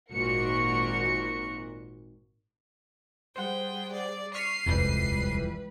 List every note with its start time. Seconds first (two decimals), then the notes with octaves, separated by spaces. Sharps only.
0.13 G#1 A#2 F#4 A#4 C#7
3.36 G3 G#4 C5 F#5 G5
3.92 D5
4.34 C#6 F6 B6 C7 D#7
4.66 D#1 C2 F2 E3 G3 G#3 B4